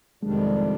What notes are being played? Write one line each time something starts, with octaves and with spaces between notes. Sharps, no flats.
F2 C3 D#3 G3 G#3 D4